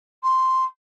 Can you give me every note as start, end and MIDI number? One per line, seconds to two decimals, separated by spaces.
0.23 0.65 84